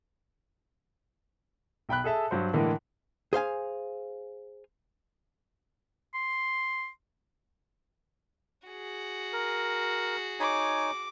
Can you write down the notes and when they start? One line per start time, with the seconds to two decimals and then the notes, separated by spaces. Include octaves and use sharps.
1.89 B1 G5 B5 F#6
2.04 G#4 A4 E5 A5
2.31 G2 F#3 C5
2.53 A2 D3 E3 G#3 A#3
3.33 G#4 C5 F5 G#5
6.14 C6
8.67 F#4 G#4
9.33 A#4
10.40 D#4 C#5 G#5 D6